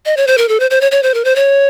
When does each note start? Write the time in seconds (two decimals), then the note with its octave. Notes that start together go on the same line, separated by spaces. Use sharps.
0.06 D#5
0.17 C#5
0.27 C5
0.38 A#4
0.49 A4
0.60 C5
0.70 C5
0.81 C#5
0.92 C#5
1.03 C5
1.14 A#4
1.25 C5
1.36 C#5